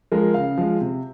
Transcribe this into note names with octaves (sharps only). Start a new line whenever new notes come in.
F3 G#3 A#4
C#3 F5
F3 G#3
C3